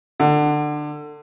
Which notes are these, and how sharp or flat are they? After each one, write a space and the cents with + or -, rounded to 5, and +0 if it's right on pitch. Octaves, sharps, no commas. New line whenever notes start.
D3 +25